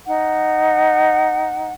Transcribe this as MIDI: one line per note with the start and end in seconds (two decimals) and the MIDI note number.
0.06 1.72 63
0.06 1.72 78